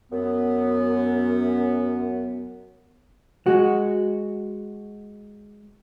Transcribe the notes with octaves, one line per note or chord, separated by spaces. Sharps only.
F#2 B3
G#3 F#4